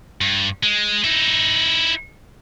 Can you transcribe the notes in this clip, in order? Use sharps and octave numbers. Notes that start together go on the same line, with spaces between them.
G2
G#3
D#4 E4